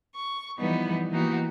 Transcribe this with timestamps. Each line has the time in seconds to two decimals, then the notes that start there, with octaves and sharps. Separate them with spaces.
0.14 C#6
0.58 E3 F3 G3 B3 D#4 B4
1.11 E3 A#3 B3 D#4 F#4 G4